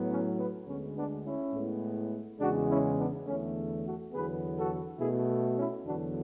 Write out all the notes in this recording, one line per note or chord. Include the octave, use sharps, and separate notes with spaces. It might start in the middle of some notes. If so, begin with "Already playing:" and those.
Already playing: A2 F#3 B3
C#4
B3
D2 D3 G#3 B3 C#4
B3 D4
C#4 E4
A2 G#3 B3
E2 C#3 G#3 D4 F#4
C#4 E4
B3 D4
E2 D3 A3 C#4
F#4 A4
E2 D3 F#3 B3 G#4 B4
F#4 A4
B2 A3 E4 G#4
C#4 E4
E2 D3 F#3 B3 D4 F#4